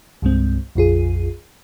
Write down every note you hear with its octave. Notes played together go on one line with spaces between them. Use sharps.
C2 G2 G#3 C4
A#1 F2 F4 G#4